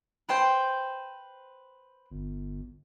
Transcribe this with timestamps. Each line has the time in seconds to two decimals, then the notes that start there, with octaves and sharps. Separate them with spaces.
0.29 B4 C5 G5
2.11 G1